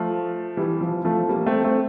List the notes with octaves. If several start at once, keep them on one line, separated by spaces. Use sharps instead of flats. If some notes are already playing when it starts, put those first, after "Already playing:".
Already playing: F3 A3
E3 G3
F3
F3 A3
G3 A#3
A3 C4
A3 C4